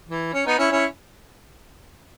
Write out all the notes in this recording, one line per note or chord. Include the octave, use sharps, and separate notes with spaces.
E3
C#4
B3 D#4
C#4 E4
C#4 E4